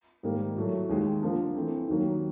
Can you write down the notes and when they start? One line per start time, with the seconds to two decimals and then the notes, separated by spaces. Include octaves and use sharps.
0.23 G#2 D#3 G3 A#3
0.55 A2 F#3 A3
0.89 D#2 D#3 G#3
1.22 D3 F3 A#3
1.56 E3 A3 C4
1.88 D#2 D#3 F#3 A#3